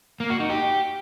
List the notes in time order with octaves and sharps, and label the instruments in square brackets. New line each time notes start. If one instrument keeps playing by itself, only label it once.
[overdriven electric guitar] A#3
F#4
D#4
G4